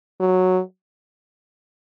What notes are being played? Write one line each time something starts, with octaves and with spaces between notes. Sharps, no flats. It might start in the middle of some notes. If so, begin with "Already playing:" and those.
F#3